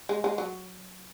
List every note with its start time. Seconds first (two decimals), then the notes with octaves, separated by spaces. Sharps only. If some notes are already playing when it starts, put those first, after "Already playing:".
0.09 G#3
0.24 G#3
0.38 F#3